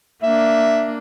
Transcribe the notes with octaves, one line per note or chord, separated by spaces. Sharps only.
A#3 D4 E5